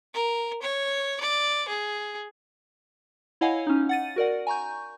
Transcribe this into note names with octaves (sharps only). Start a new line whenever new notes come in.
A#4
C#5
D5
G#4
E4 C#5 D#5 F5 F#5 G#5
C#4 D#4
F#5 A6 D#7
F#4 A#4 D5 F#5
G#5 A#5 C#6 G6